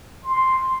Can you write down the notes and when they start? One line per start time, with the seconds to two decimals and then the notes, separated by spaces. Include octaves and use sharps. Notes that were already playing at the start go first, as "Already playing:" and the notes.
0.24 C6